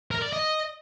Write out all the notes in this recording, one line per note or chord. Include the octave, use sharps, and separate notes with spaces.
A#4
D5
D#5